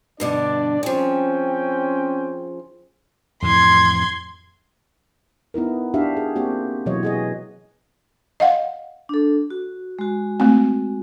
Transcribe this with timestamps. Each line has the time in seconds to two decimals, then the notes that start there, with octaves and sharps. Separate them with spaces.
0.20 G2 B2 D3 D4 D5
0.83 C#3 F3 C4 C#4 G5
3.42 F2 A2 E3 C6 G#6
5.54 B3 D#4 E4 A#4
5.94 D4 F#4 G4 E5 F5
6.17 G#4
6.36 A#3 C4 F#4 G4
6.86 B2 E3 F#3 C#5 D#5
7.03 F#4 G#4 D#5
8.40 D#5 F5 F#5
9.09 D4 A4
9.50 F#4
9.99 G#3 F#4
10.40 A3 C4